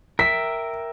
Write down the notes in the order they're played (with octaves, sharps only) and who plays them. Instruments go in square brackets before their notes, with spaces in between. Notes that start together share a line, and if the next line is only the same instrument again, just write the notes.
[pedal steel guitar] A#4 E5 G5 [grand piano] B6